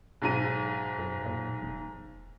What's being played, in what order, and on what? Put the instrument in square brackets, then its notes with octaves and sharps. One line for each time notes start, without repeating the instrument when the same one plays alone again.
[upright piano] B1 G#2 D#7
[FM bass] F#2
A#2
E1